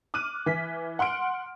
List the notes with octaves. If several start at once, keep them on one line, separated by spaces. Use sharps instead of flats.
D6 F6 F#6 D#7
E3 B6
F#5 C6 F6 D7